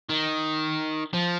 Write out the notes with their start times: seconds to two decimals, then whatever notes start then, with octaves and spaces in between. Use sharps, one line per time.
0.09 D#3
1.13 F3